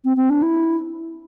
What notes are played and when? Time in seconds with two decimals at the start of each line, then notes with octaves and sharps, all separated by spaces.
0.05 C4
0.17 C4
0.30 D4
0.42 E4